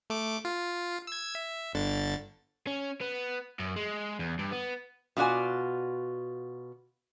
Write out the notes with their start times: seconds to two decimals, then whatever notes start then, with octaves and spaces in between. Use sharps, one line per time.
0.10 A3 D6
0.45 F4
1.07 E6 G#6
1.35 E5
1.73 G1 D3 A6
2.67 C#4
3.01 B3
3.60 F#2
3.76 G#3
4.19 E2
4.39 G2
4.52 B3
5.17 B2 F4 F#4 D5 G#5